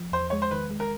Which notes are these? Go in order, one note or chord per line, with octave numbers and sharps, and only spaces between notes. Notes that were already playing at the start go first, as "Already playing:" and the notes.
Already playing: F3
E2 C5
G#3 C#5
C5
D#3 B4
G#3
A#4